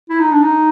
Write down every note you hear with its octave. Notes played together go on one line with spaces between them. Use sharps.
E4
D#4
D4
D#4